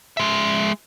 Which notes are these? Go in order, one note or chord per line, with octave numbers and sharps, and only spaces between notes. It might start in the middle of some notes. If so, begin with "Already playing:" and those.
G#3 E5